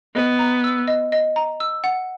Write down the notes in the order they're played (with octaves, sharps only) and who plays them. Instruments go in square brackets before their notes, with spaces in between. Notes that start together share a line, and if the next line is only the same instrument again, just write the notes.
[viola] B3 [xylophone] D#5
[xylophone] A#5
E6
D#5
D#5
A#5
E6
F#5